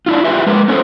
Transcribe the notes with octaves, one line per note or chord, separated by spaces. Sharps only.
D4 E4 F4
E4 F4 G4 G#4 B4 E5
G#3 A#4 B4
B3 C#4 E4 A4 C5